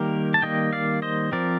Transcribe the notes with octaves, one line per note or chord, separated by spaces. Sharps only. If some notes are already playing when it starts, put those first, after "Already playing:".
Already playing: D#3 G3 A#3 G4 A#4
A5
D#3 G3 A#3 D#5 G5
D5 F5
C5 D#5
F3 C4 A#4 D5